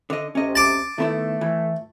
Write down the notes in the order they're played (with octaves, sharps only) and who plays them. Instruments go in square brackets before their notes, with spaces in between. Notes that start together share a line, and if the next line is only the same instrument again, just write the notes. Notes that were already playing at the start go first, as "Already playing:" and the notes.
[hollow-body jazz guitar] D3 D#5
[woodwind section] D2 C3 [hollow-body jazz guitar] C#4 D#5
[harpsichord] A5 D6
[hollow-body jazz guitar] D#3 B3 E4 [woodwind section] A3
[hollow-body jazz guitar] E3